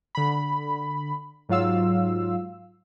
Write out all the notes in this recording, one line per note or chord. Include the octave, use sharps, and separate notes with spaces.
D3 B5
G#2 F#3 F4 F5 E6